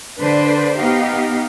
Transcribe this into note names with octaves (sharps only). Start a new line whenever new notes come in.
D3 D4 B4 C5 D5
B3 D#4 G4 F5